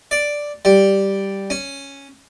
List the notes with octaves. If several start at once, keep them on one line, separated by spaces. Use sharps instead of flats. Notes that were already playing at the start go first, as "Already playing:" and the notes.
D5
G3
C#4